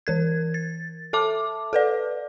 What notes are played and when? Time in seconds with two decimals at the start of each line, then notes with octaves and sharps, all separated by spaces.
0.07 E3 A#4 G#6
0.54 A6
1.13 A4 E5 A5 D6
1.73 A4 B4 D5